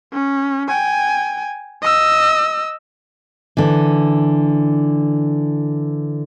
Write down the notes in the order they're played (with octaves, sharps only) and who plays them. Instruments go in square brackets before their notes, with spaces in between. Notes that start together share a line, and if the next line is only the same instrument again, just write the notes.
[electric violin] C#4
G5 G#5
D#5 E6
[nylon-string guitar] D3 E3